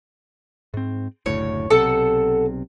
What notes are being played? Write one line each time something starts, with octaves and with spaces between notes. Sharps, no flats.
G#2 C4
F#1 D2 A2 C#5
B1 C3 A4 F#5 A5